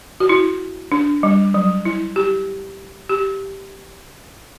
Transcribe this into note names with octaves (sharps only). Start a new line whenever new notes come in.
F#4
E4
D4
G3
F#3
E4
G4
G4